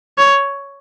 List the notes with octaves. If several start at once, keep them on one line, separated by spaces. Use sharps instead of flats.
C#5